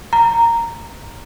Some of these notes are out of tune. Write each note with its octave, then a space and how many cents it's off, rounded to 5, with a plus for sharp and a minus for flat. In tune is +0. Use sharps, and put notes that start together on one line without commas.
A#5 -10